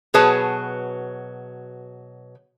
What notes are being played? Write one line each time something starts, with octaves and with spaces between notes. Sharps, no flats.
B2 F#3 G#4 B4 C#5 A5